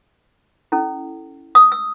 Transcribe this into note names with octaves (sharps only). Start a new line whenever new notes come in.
C#4 E4 A4
D#6
E6